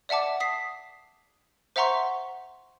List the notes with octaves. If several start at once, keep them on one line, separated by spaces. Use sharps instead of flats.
D5 E5 F#5 A5 D6
D#6 B6 C7
C5 E5 F#5 A#5 C6 C#6